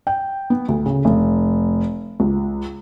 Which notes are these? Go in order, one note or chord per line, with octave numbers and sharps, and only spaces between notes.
G5
B3
D2
C#3
F1
C#2